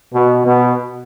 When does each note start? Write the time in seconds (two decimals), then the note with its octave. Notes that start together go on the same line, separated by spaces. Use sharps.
0.13 B2
0.45 B2